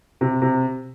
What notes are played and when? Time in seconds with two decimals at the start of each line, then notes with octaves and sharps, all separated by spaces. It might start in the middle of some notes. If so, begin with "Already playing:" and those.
0.21 C3
0.42 C3